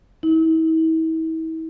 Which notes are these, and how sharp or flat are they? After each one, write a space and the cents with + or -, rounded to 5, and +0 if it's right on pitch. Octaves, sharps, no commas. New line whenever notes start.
E4 -40